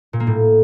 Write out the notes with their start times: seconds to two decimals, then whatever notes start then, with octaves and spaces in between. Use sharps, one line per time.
0.13 A#2
0.20 A#3
0.27 A2